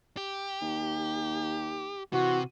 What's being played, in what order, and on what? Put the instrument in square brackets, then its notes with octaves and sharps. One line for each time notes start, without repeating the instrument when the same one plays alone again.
[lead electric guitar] G4
[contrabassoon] D#2
[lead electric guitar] C3 [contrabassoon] E3 [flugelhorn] F#4